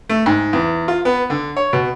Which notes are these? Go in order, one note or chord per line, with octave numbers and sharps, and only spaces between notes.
A3
G#2
E2
F4
B3
D3
C#5
B2